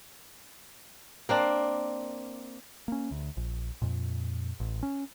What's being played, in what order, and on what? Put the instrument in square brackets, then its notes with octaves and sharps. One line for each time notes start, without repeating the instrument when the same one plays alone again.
[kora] A#3 C4 D4
[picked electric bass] A#3 C#4
D2
A#1
F2 A#2
A1
C#4